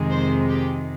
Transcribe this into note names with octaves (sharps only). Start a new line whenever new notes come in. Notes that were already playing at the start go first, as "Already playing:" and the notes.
Already playing: F2 C3 D#3 G#3
C5
G4